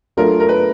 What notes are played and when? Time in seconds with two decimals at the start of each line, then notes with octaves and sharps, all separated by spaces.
0.17 F#3 A3 D4 F4 A4 A#4
0.40 A#4
0.49 B4